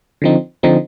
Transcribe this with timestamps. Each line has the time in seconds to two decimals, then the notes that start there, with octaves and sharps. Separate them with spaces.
0.22 D3 F3 C4 D#4
0.63 D3 F3 C4 D#4